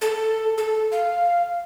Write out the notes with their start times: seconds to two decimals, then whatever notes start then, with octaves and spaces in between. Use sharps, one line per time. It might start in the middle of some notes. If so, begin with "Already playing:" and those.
0.01 A4
0.58 A4
0.92 F5